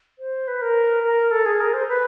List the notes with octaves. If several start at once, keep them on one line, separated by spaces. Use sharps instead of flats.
C5
B4
A#4
A#4
A4
G#4
A#4
C5
B4